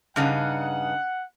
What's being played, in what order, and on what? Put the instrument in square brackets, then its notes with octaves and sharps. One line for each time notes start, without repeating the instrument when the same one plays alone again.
[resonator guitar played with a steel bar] G2 C#3 D#4 [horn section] F#5